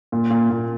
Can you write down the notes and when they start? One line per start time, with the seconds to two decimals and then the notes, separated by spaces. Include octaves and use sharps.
0.12 A#2
0.31 A#2
0.50 A#2